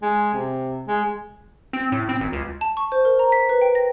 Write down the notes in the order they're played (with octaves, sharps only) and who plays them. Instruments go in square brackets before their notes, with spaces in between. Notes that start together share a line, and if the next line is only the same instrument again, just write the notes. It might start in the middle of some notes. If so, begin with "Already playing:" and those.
[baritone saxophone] G#3
C3
G#3
[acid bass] C4
A2
C4
G#1
C#2
[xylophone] A5
C#6
C5
A#4
A#5
B6
B4
G5
A#6